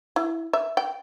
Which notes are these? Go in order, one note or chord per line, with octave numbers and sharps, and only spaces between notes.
E4
E5
G5